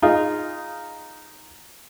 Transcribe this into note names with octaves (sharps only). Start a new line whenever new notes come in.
D#4 F4 G#4